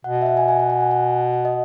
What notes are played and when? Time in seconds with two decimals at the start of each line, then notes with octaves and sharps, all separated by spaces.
0.04 B2 F#5
0.15 F#5
0.22 E5
0.26 F#5
0.37 G#5
0.48 G#5
0.59 F#5
0.70 F#5
0.81 G#5
0.91 F#5
1.34 F#5
1.45 D#5